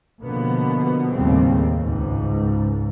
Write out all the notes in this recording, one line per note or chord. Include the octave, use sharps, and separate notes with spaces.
B2 D3 F3 A#3 B3
D#2 A2 C#3 G3 C4
C#2 G#2